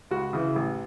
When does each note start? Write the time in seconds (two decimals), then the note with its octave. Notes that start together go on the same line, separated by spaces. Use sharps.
0.11 C#2 F#4
0.33 C#3 E3
0.56 A1